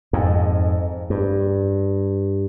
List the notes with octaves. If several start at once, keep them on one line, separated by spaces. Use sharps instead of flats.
F2 G#2
G2